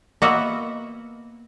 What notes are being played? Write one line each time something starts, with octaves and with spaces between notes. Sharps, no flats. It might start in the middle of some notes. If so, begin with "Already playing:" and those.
A#3 B3 F#4 D#5 E5 F#5